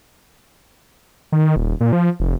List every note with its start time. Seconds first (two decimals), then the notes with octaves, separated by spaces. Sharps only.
1.32 D#3
1.56 D#1
1.81 A#2
1.93 F3
2.20 F1